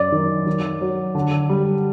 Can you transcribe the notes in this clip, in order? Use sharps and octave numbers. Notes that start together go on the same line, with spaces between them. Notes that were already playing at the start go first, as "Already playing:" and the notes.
Already playing: F#2 D5
D#3
D#3
F#3
D3
G3